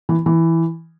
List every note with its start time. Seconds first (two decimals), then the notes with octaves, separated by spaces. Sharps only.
0.09 E3
0.26 E3